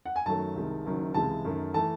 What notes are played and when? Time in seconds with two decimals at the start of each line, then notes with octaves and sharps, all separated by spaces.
0.06 F#5
0.16 G#5
0.26 F#2 D#3 F#3 A3 A5
0.55 C2 C3 D#3 G#3
0.85 F#1 F#2 D#3 F#3
1.14 C#2 C3 E3 G#3 A5
1.45 F#2 D#3 A3
1.74 E3 A3 A5